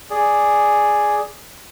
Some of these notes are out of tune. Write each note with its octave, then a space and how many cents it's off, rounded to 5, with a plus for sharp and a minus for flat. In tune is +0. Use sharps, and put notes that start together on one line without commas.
G#4 +0 D5 +0